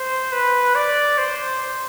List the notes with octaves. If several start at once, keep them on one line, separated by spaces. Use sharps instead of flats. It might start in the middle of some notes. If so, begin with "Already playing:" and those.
Already playing: C5
B4
D5
C5